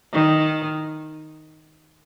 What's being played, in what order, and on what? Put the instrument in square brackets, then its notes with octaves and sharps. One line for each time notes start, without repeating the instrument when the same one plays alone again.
[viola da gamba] D#3